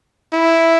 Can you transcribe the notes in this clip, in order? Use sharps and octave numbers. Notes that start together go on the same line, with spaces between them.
E4